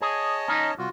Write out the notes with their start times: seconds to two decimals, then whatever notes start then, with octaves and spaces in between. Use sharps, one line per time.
0.01 G#4 C#5 D#5 A5
0.48 C#4 D#4
0.78 C2 F4 F#4